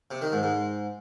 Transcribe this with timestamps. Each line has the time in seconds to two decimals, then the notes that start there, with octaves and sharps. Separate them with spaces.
0.11 C3
0.21 D#3
0.32 G#2
0.43 G#2